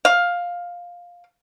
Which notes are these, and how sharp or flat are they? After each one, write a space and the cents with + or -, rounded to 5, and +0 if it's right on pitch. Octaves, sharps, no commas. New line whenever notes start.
F5 +10